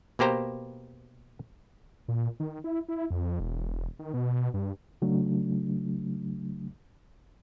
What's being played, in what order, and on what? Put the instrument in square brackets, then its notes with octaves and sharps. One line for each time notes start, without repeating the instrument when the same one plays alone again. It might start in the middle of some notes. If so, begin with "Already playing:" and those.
[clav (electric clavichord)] B2 A#3 G4 C5 A#5
[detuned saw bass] A#2
D#3
E4
E4
F2
E1
D#3
B2
G2
[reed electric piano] C#3 F#3 A3 D4